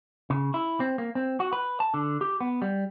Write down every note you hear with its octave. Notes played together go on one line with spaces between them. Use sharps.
C#3
E4
C4
A#3
C4
F#4
B4
A5
D3
G4
B3
G3